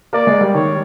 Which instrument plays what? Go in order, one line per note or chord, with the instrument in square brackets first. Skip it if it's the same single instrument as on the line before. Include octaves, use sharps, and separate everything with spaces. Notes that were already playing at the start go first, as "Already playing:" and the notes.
[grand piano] A#3 [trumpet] D5
[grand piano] G#3
G3
[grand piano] D#3 [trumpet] C#5